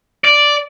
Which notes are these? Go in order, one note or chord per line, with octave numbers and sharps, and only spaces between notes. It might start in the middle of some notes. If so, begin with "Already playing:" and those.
D5